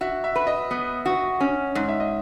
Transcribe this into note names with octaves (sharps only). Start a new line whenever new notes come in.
F#4 E5
E5
B4
D#5
B3
F#4
C#4
G#2
E5
D#5